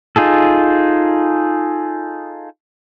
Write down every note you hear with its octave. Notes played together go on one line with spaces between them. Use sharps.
D#4 F4 G#4 A4